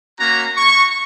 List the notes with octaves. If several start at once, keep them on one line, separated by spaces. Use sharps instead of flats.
A#3 C#4 F#4 A#5
C#6